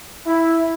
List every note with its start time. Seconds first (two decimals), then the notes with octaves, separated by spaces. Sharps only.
0.26 E4